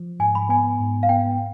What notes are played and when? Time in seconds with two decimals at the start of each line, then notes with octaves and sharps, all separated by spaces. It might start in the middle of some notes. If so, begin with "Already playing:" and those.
Already playing: F3
0.19 G#2 G#5
0.35 B5
0.49 B3 G#5
0.80 G#2
1.03 F5
1.09 B3 G5